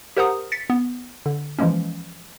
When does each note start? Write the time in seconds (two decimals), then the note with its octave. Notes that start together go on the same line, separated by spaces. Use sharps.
0.17 G4 A#4 C5 F#5 A#5 D#6
0.52 A6 B6 C#7
0.70 B3
1.26 D3
1.59 E3 F3 G#3 A#3 C#4